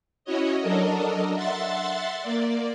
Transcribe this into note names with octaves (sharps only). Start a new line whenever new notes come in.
C#4 E4 F#4 C#5 D#5
F#3 D4 A4 A#4 D#5
E5 F#5 C6 A6
A#3 D5